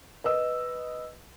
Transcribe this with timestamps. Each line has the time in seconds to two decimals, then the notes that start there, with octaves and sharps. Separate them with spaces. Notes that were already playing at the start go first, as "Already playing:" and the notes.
0.24 B4 D#5 E6